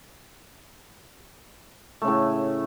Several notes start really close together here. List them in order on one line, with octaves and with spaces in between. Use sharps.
A3 C#3 A2